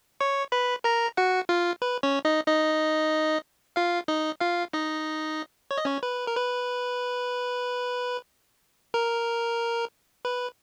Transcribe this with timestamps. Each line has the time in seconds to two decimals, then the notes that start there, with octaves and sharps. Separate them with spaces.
0.20 C#5 C#6
0.52 B4 B5
0.84 A#4 A#5
1.17 F#4 F#5
1.49 F4 F5
1.82 B4
2.03 C#4 C#5
2.25 D#4 D#5
2.47 D#4 D#5
3.76 F4 F5
4.08 D#4 D#5
4.41 F4 F5
4.73 D#4 D#5
5.71 C#5
5.78 D#5
5.85 C#4 C#5
6.03 B4
6.27 A#4
6.36 B4
8.94 A#4
10.25 B4